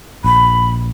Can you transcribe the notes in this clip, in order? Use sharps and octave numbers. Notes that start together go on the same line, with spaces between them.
A#1 B5